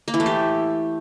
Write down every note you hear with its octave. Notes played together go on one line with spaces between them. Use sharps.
A#3
E3
A3
G4